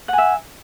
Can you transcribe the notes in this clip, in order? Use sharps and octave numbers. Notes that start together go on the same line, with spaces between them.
E5 F#5 G#5